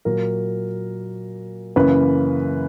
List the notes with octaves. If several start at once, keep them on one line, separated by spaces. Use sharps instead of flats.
A#2 F#3 A#3 A#4
F#2 C#3 E3 A#3 B4